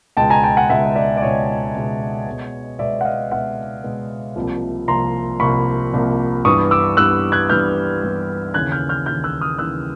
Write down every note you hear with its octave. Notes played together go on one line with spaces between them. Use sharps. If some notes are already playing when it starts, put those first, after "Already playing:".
C#2 B2 G#3 G5 A5
G#5 A#5
G5 A5
F#5 G#5
C#2 B2 G#3 E5 F#5
D5 E5
D5
C#2 B2 G#3 C#5 D#5
C#2 B2 G#3
B2 G#3 B3
B2 G#3 B3 D5 E5
F#5
D#5 F5
B2 G#3 B3 E5 F#5
B2 G#3 B3
C2 C3 F3 A#3
C2 C3 F3 A#3 A#5 C6
C2 C3 F3 A#3 B5 C#6
C2 C3 F3 A#3
G2 E3 G3 B3 C#6 D#6
D6 E6
G2 E3 G3 B3 E6 F#6
F#6 G#6
G2 E3 G3 B3 F6 G6
G2 E3 G3 B3
D#2 C#3 E3 F#6 G#6
F6 G6
F6 G6
D#2 C#3 E3 F6 G6
E6 F#6
D#6 F6
D#2 C#3 E3 E6 F#6